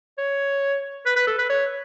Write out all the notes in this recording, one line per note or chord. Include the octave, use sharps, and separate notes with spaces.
C#5
B4
B4
A4
B4
C#5